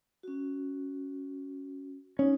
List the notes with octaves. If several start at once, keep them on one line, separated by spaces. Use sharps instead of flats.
C#4 F#4
C#4 D#4